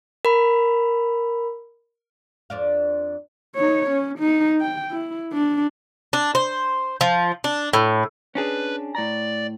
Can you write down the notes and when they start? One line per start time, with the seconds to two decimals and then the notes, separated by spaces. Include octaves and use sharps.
0.25 A#4 B5
2.50 F2 D4 F5
3.55 D#4 C#5
3.90 C#4
4.19 D#4
4.61 G5
4.91 E4
5.33 D4
6.13 D4
6.35 C5
7.01 F3
7.44 D4
7.73 A2
8.35 C#4 D4 G#4 B4
8.95 A2 D5 A#5